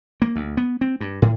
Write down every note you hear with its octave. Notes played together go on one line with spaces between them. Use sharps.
A#3
D2
B3
C4
G2
A2